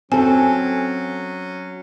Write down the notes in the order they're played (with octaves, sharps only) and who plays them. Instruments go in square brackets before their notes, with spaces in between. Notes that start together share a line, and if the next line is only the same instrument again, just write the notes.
[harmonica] F#3 C#4 [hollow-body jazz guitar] C4 A4 [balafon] G#5